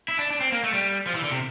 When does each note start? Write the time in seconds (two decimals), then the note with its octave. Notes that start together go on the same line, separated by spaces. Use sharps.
0.08 E4
0.19 D4
0.30 D4
0.40 C4
0.52 A#3
0.64 A3
0.74 G3
1.07 F3
1.15 E3
1.24 D3
1.32 C3